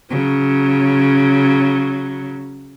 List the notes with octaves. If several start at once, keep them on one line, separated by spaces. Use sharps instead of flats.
C#3 F#3